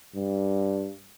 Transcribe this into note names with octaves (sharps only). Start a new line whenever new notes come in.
G2